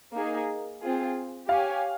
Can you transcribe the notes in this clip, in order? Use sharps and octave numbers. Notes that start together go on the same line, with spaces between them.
A#3 D#4 G#4
C4 F4 G#4
G4 C#5 F5 G#5